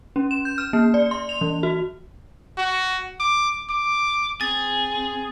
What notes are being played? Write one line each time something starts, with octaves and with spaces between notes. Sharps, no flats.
C#4
E7
G6
F6
A#3
D5
C6
F7
E3
F#4
F#4
D6
D6
C4 G#4 A6